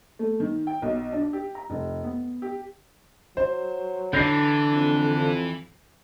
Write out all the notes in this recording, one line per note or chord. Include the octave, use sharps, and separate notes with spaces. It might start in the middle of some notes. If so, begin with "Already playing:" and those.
A3
D#3
G5
B1
D4
G4
A#5
F1
B3
G4
F#3 C5
D3 E3 D4 G6 A#6 C7
F2